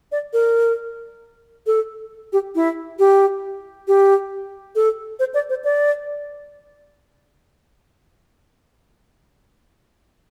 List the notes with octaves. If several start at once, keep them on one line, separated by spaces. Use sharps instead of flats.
D5
A#4
A4
G4
E4
G4
G4
A4
C5
D5
C5
D5